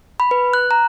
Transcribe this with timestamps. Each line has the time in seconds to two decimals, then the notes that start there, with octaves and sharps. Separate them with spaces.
0.20 B5
0.31 B4
0.53 F#6
0.71 A#5